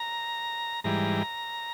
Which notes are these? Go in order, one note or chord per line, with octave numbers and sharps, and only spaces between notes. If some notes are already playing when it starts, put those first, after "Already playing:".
Already playing: A#5
G#2 E3 G3 A#5